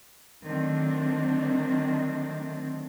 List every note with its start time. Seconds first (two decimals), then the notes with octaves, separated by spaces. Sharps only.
0.44 D3 D#3 F#3 A3 C4 D4